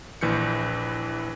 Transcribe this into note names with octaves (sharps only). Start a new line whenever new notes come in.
A#1 E3 G6 C#7